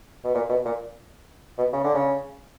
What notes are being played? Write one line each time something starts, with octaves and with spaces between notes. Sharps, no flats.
B2
A#2
B2
A#2
B2
C#3
D3
C#3